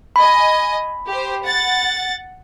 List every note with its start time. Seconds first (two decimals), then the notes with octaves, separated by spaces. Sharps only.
0.16 D#5 G#5 B5
1.07 G4 C5
1.44 F#5 A6